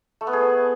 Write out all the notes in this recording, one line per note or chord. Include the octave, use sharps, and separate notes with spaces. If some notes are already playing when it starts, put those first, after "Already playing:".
A3
B3
G#4